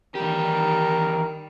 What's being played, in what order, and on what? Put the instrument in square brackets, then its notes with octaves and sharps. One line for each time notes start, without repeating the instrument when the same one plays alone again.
[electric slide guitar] E2 G4 [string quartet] D#3 G3 [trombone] A#4